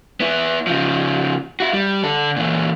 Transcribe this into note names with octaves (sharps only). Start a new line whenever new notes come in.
B3 E4
C#3 F3
E4 F#4
G3
D3 A4
A#2 E3